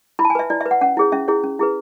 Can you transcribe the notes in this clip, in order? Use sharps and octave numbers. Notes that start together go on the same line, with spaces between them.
E4 B5
A5
G#5
B4 E5
E4 D5
E5
B4
F#5
C#4 F#5
E4 G#4 C#5
C#4 E5
E4 G#4 C#5
C#4
E4 G#4 B4